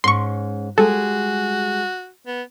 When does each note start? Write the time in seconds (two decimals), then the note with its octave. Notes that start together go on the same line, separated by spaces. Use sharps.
0.04 G#2 C#4 C6 C#6
0.78 G3 G#3 F#4 G#4 A4
2.27 B3